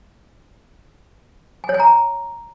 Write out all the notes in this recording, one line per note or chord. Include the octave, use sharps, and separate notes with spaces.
G#5
C#5
G#5
A#5